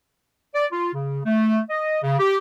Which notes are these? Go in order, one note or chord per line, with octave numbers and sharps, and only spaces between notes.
D5
F4
C#3
A3
D#5
C#3
G4